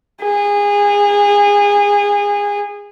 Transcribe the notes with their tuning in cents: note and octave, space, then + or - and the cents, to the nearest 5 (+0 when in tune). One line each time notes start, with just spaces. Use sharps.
G#4 -25